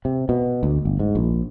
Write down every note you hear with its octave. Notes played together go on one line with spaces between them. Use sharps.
C3
B2
D2
G1
G#2
A#1